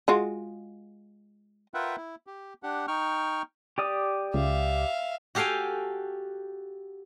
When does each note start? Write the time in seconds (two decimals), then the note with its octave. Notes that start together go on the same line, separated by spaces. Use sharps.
0.08 G#3 F4 F#4
1.74 F4 A#4 B4 E5 F#5 G5
1.97 E4
2.27 G4
2.63 D4 G4 F#5
2.88 D#4 G5 C#6 F6
3.78 G4 D5 D#6
4.34 C#2 E5 F5
5.35 F#4 G4 A4 F5 G5 G#5